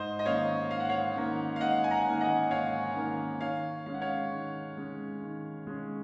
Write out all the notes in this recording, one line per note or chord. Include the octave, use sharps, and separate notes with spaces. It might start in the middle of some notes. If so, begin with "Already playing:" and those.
Already playing: G#2 C5 D#5
D#5
D#3 A#3 C#4 C#5 F5
G#2 F5
F#5
C#5 F5
D#3 A#3 C#4
F5
G#2 D#5 F#5
G#5
F#5 A#5
D#3 A#3 C#4
D#5 F#5
G#2 C#5 F5
D#3 A#3 C#4
D#3 C#5 F5
G#3 C#4 F5
F#5
C#5 F5
D#3
G#3 C#4
D#3
G#3 C#4